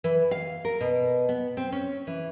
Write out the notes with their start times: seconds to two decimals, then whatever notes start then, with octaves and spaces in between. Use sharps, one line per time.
0.04 E3
0.31 F5
0.65 A#4
0.81 B2
1.29 B3
1.57 C4
1.72 C#4
2.07 E3